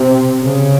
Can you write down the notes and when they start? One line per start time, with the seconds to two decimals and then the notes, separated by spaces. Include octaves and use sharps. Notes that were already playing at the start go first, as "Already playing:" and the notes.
Already playing: C3
0.40 C#3